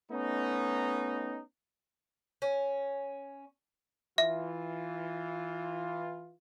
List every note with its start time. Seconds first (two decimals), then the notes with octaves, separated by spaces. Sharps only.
0.11 A3 B3 C#4 D#4
2.42 C#4
4.18 E3 F4 E5